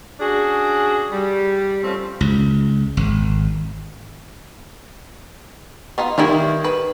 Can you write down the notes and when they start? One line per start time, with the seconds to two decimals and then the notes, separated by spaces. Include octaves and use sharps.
0.19 C#4 D4 F#4 G#4
1.12 G3
1.83 F3 A3 C4 C#4 F4
2.21 C#2
2.97 G#1
5.98 B3 D#4 F4
6.18 D#3 E3 G3 E4
6.64 B4